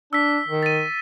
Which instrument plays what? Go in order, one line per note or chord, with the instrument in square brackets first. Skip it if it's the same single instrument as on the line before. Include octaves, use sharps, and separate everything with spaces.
[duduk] D4 [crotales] E6 B6
[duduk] D#3
[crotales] A6 D#7